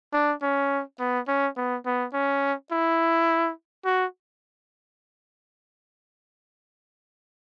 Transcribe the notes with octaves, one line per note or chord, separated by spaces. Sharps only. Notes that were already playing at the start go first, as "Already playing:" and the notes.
D4
C#4
B3
C#4
B3
B3
C#4
E4
F#4